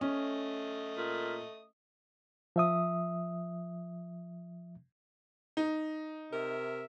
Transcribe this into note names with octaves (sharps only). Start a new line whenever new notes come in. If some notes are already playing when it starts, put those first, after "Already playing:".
A3 C#4 D#5 D#6
A#2
F3 E5 D#6
D#4
C3 A#4 E5